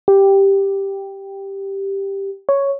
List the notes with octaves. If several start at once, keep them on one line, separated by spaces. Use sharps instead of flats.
G4
C#5